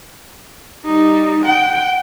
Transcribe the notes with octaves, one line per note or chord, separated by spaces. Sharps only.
G3 D#4
F#5 G5